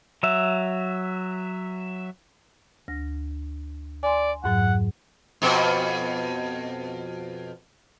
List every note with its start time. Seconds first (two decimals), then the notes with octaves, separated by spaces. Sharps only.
0.23 F#3 E5
2.88 D2 A#6
4.03 D5 G#5 C6
4.44 F2 G#2 F#3 F#5
5.42 F2 B2